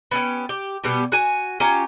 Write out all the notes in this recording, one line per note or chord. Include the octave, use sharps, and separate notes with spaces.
B3 C#4 G4
G4
B2 G3 B3 G4
F#4 G#5
C#4 F4 G4 A#5